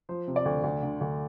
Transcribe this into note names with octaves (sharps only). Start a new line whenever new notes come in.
F3 C5
C3
D5
D2
D2
D3
D2